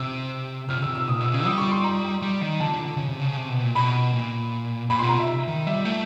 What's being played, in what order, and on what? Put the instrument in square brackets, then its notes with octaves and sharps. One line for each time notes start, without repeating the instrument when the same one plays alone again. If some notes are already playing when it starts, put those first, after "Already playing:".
Already playing: [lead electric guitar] C3 [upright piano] E6
[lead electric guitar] C3 [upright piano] F6
[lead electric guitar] C#3
[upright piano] E6
[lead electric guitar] C3
[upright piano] E6
[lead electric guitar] A#2 [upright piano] D#6
[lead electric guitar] B2 [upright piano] E6
[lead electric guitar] C#3
[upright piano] E6
[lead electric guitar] G3 [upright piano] D#6
[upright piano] C#6
C6
A#5
[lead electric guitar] G3
D#3
[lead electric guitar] D3 [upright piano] A5
[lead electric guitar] D3
D3
C#3
C3
C#3
C3
B2
A#2
[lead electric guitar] B2 [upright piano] B5
[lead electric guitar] A#2
[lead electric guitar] A#2 [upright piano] B5
[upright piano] C6
[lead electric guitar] B2
[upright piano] A#5
[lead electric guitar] C3 [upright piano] E5
[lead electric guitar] D#3
[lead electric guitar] G3 [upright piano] E5
[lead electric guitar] A3